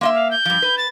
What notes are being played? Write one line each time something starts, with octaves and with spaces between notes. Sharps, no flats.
A#3 D#5 E5 C6
F5
G6
G2 F3
B4
A6